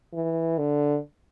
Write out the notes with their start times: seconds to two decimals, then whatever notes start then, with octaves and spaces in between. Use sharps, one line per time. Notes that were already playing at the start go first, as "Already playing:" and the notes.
0.14 E3
0.58 D3